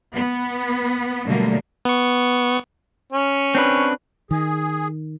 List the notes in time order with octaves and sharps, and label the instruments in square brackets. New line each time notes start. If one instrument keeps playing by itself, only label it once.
[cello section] B3
B2 D3 F#3 G3 A3 A#3
[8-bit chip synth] B3 C#6
[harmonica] C#4
[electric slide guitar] C4 D4 B4
[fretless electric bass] D#3 [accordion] G#4